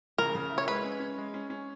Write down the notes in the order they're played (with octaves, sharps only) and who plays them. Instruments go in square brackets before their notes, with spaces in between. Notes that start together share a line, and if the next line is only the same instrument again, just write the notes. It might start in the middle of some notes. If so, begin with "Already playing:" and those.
[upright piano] C#3 [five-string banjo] A#4
[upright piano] C#3
E4
[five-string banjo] C#5
[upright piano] G#3 [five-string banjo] B4
[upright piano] C#4
C#4
G#3
C#4
C#4